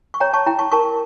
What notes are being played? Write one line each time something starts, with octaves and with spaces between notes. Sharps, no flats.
C#6
C#5 G5 A#5
A5 C#6
E4 G5 A#5
A5 C#6
A#4 A5 C#6